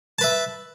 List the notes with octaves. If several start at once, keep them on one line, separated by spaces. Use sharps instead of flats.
B4 E5 A5